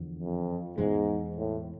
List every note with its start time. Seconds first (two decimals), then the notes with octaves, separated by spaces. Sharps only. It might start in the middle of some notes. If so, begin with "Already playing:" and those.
Already playing: E2 D3 F3
0.19 F2
0.77 E2 G#2 B2 G#3
1.37 A2